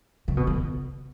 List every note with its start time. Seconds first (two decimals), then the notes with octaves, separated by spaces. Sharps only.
0.28 C#3
0.37 B2
0.47 D3